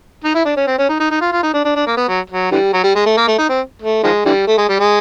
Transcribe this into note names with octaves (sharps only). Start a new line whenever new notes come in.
D#4
E4
D4
C#4
C4
C#4
D#4
D#4
D#4
F4
F4
D#4
D4
D4
D4
A#3
B3
F#3
F#3
D3 E3 G3
F#3
G3
G#3
A3
A#3
A3
D#4
C4
A3
D#3 F3 G#3
D3 E3 G3
A3
G#3
G3
G#3